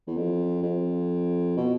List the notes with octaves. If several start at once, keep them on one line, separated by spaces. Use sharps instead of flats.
E2
F2
F2
B2